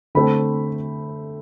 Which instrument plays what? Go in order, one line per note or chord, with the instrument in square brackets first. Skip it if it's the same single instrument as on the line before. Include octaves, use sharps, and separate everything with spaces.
[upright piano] D3 A3 C4 B5